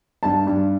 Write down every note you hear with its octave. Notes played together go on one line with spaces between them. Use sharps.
G2 A5
G2